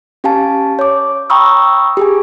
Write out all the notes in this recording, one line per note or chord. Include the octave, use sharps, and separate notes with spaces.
C#4 G4 F5 G#5 A5
C#5 D6
G5 A#5 B5 C#6 D#6 E6
G4 G#4 G#5